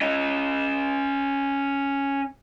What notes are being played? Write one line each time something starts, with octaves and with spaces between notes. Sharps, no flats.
C#4 D#5